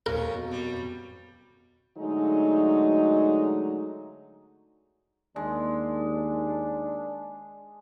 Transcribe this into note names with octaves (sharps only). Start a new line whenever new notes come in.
D#2 F3 F#3 C#4 A#4
F2 B2
F#3 G3
D3 F#3 G#3 A3 D#4
D#2 G#3 D4